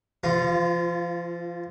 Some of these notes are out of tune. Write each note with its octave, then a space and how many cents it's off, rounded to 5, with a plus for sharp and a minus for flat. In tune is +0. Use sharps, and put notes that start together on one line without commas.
F3 -35 F4 +0